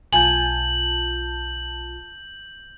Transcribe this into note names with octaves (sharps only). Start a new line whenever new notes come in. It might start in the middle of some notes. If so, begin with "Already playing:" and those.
B1 F4 G#5 A5 G6 F#7